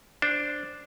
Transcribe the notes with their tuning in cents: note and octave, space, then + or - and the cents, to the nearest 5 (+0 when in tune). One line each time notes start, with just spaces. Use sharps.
D4 +0 C5 +0